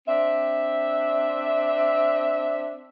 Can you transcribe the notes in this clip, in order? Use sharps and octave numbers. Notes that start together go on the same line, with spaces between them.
C4 D4 E5